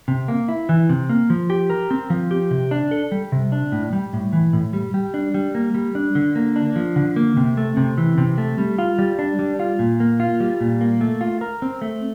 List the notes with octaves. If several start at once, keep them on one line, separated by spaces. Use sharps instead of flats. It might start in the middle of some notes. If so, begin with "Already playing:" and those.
C3
A#3
E4
E3
C3
A#3
F3
G4
A#4
C4
F3
G4
C3
D4
A4
G3
C3
D4
A2
G3
A2
E3
A2
G3
G3
D4
G3
A#3
G3
D4
D3
A#3
D4
F3
D3
A#3
C3
A3
C3
E3
C3
A3
G3
F4
G3
D4
G3
F4
A#2
A#3
F4
G3
A#2
A#3
A3
F4
A#4
C4
A3